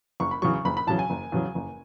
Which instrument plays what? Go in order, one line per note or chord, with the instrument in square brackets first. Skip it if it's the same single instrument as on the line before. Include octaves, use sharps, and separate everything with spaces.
[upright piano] F#1 C#6
B5
E2 C#3 F#3 C#6
C#6
F#1 B5
B5
E2 C#3 F#3 A5
G#5
F#1
E2 C#3 F#3
F#1